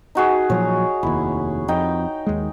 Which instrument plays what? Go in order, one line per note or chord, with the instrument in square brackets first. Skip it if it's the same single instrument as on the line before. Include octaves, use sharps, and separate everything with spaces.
[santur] D#4 F#4 G#4
[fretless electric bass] A#2 F3 F#3 [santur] C#5
[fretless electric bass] F1 D#2 [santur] E4
[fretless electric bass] F2 [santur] D#4 G5
[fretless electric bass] D#2 G#3